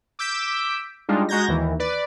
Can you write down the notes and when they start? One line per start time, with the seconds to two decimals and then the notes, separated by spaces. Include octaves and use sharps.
0.19 D6 E6 G6 B6 D7
1.09 G3 G#3 D4 D#4 F4
1.29 G#3 F#4 A#5 G6 G#6 A#6
1.48 D#2 D#3 E3
1.79 B4 D5